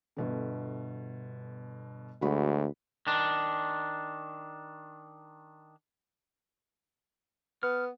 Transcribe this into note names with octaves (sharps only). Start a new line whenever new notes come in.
G1 B2 D3
D2 G#3 F#4 B5
D#3 D4
B3 F6